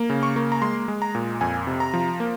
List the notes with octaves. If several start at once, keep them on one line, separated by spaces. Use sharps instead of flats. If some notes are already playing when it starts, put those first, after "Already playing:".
Already playing: A#3
C#3
C#6
A#3
A#5
G#3 C6
G#3
A#5
A#2
F2 G#5
C3
A#5
F3
A#3